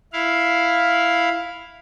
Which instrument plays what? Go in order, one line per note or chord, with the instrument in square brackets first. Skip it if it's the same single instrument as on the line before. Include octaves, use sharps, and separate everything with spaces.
[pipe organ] E4 F5